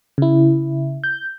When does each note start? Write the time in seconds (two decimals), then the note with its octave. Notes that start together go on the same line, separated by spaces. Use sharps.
0.18 C#3 E4
1.04 G6